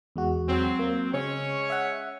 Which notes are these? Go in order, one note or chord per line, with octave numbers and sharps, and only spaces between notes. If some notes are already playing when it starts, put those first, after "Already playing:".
E2 G#3 F#4
F#3 C4
A#3
C#3 G#3 C#4 C#5
E5 F#5